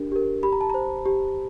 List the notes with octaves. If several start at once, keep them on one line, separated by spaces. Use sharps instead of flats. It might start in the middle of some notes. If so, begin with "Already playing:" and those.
Already playing: D4 G4 A#4
G4 A#4
G4 B5
A#5
A5
C5 A#5
G4